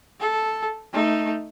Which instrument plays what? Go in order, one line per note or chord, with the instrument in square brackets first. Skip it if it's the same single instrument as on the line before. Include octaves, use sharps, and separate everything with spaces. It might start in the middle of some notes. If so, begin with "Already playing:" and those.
[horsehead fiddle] A4
A3 D#4